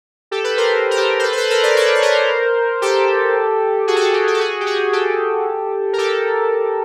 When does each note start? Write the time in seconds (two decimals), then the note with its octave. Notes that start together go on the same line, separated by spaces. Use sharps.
0.31 G4 A4
0.44 A4 B4
0.57 A#4 C5
0.91 A#4
0.97 G4 A4
1.19 C5
1.23 A4 B4
1.32 C5
1.37 A4 B4
1.50 A#4 C5
1.63 C5 D5
1.77 B4 C#5
1.95 C#5
2.02 A#4 C5
2.82 G4 A4
3.87 F#4 G#4
3.96 A4
4.01 F#4 G#4
4.14 G4
4.27 G4
4.34 A4
4.40 F#4 G#4
4.60 G4
4.66 F#4 G#4
4.93 G4 A4
5.93 A#4
5.98 G4 A4